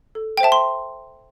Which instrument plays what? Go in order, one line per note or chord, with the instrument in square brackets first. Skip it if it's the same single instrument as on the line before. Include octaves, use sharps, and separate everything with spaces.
[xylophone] A4
G5
C5 E5 A5
C6